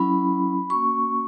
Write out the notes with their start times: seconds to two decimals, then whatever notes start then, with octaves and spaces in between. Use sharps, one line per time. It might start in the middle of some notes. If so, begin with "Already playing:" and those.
Already playing: F#3 C#4 E4 B5
0.70 A#3 C#4 F#4 C#6